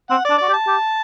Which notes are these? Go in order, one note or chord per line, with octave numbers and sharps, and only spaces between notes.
C4 F#5
D5
D4
F#4 D5
G4
A5
G4